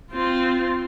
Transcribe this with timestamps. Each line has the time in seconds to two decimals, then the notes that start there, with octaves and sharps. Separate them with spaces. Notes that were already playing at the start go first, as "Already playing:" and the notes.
0.12 C4 F4